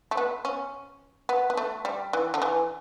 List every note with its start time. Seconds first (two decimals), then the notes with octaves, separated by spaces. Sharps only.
0.11 A3
0.17 B3
0.45 C#4
1.29 B3
1.50 B3
1.57 A3
1.85 G3
2.13 E3
2.34 D3
2.42 E3